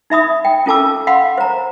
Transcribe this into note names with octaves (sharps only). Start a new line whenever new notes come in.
D#4 E5 B5 D#6
G5
C#4 F4 A4 A5 D6 E6
F5 F#5 B5 C6
C5 A#5